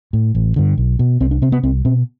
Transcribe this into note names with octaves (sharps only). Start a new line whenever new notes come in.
A2
A1
G2 D3
B1
B2
C2 C4
D4
C3 C4
B3
C2 C4
B2 C4